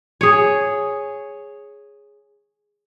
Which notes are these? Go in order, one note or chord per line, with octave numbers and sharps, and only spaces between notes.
G#4 C#5